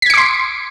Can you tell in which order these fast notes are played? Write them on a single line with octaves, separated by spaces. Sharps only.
B6 G#6 C#7 D6 C6